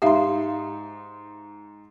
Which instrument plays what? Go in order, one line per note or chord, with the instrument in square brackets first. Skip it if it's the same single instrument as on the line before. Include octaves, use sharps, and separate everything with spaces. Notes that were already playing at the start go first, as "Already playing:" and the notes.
[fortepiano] G#2 D#4 C6 [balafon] G4 E5 F5